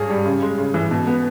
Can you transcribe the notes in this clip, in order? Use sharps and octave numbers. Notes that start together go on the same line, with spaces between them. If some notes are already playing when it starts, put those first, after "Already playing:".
Already playing: G2 C#4 G#4
G3
C#3
G#3
C#3
E3
B2
B3